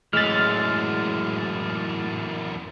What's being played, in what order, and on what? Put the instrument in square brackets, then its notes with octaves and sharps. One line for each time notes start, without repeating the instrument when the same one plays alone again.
[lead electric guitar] F#2 E3 [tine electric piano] A2 E6 B6 [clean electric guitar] G#3 [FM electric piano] F6 A6